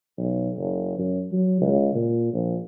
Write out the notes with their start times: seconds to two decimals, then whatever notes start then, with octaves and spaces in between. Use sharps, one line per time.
0.18 B1
0.57 F#1
0.98 F#2
1.32 F#3
1.61 C#2
1.94 A#2
2.34 A#1